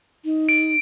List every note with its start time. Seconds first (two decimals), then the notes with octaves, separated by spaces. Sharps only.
0.25 D#4
0.49 D7